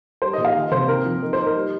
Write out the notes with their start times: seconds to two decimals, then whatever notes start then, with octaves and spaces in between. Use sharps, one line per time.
0.22 G3 C5
0.33 D#5
0.38 A#2
0.45 F5
0.55 D#3 D#5
0.71 C3 C5
0.88 C4 A#4
1.05 F3
1.22 D#4 A#4
1.33 C5
1.39 D#4
1.46 A#4
1.55 G3